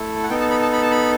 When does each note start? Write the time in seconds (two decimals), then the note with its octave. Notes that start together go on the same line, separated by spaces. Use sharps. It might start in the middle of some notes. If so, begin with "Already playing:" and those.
Already playing: A3 E4 A4
0.23 F#5
0.30 B3 D#4 A4 G5
0.40 A5
0.51 B5
0.62 A5
0.72 B5
0.82 A5
0.91 B5